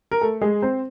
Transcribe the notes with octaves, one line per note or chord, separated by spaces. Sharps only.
A#4
A3 A4
G#3 G#4
C4 C5